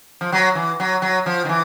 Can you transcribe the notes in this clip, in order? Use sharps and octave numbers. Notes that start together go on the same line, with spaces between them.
F3
F#3
E3
F#3
F#3
F3
D#3
E3